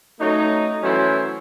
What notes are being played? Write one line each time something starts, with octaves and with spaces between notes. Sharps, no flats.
F#3 A3 C#4 D#4
E3 F#3 A3 C#4 E4 C5